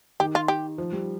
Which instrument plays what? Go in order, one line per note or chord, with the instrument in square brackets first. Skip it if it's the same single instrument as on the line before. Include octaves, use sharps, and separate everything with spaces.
[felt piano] D#3 [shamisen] G4
[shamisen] F4
G4
[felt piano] F3
G3